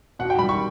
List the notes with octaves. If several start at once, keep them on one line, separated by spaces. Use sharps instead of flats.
B2 F#5
G5
G3 B5
C#6